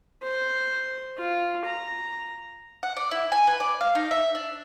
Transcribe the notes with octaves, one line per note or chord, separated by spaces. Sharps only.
C5
F4
A#5
F#5
D5
E4
G#5
B4
D5
F5
D#4
E5
D4